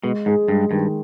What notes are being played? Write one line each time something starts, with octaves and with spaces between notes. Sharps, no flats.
B2 G#3
G#2 G#4
G2 G#3
G2 D#3